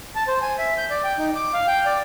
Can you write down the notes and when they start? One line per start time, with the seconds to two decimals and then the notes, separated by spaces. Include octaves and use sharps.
0.16 A5
0.28 C5
0.42 G#5
0.58 E5
0.78 G6
0.90 D5
1.04 G5
1.18 D#4
1.35 D6
1.54 F5
1.67 G5
1.86 D5